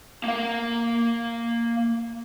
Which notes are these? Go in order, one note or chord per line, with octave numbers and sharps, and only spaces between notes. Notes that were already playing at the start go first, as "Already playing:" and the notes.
A#3 F5